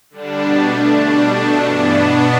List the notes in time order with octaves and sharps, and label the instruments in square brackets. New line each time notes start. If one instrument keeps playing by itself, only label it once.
[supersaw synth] D3 G3 D4
B2 G3 B3 D4 D5
D3 A3 D4 E5
B2 G3 D4 A5
B2 A3 D4 G5
G2 E3 B3 D4
B2 B3 D4 E5